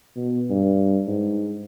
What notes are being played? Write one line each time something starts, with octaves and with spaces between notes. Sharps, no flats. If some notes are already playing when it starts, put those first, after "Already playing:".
B2
G2
G#2